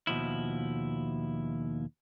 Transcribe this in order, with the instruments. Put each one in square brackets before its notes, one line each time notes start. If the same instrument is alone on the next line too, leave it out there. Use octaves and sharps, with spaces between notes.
[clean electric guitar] D#2 B2 F3 E4